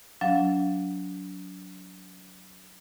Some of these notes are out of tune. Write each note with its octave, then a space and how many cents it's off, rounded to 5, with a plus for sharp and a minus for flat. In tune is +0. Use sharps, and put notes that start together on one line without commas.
F#3 -5 D4 -40 F5 +0